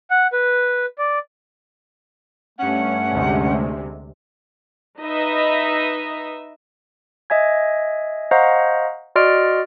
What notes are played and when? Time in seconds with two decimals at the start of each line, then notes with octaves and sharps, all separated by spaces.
0.10 F#5
0.33 B4
0.98 D5
2.59 G2 A3 C#4 F#5
3.11 D2 C3 G#3
5.00 D#4 B4 D#5 E5
7.30 D#5 E5 G#5 G#6
8.31 C5 D#5 F5 F#5 A#5 C#6
9.15 F#4 D5 D#5 C6 F6 D7